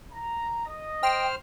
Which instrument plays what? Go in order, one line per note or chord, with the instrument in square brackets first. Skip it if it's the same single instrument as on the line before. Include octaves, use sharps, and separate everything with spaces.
[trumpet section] A#5
D#5
[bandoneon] C5 F6 [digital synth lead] G5